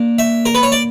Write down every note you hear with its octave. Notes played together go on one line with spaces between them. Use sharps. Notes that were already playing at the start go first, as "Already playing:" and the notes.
Already playing: A#3 D4
E5
A#4
B4
C#5
D5